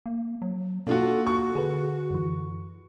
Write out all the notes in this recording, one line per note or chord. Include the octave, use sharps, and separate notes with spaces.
A#3
F#3
B2 A#3 D4 F4 F#4 A4
F#4 C#6
D3 G#4 A4 B4
F#2 E3